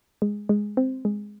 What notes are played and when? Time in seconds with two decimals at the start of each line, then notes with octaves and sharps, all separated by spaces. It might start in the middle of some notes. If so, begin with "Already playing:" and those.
0.22 G#3
0.49 G#3
0.77 C4
1.05 G#3